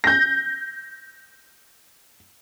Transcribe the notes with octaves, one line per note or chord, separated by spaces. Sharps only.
G6 A#6